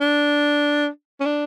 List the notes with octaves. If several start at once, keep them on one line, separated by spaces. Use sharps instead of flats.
D4
C#4
D4